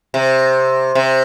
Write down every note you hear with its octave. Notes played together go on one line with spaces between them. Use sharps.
C3
C3